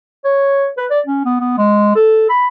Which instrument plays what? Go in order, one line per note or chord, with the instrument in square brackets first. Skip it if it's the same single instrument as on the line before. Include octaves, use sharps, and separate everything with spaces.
[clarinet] C#5
B4
D5
C#4
B3
B3
G#3
A4
B5